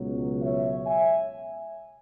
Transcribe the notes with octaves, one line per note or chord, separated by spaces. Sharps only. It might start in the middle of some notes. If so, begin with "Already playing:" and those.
Already playing: C#2 B2 F#3
C#5 E5
E5 G#5